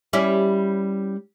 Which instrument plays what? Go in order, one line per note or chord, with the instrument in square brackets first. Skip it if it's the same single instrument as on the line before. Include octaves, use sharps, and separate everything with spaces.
[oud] G3 C#4 E4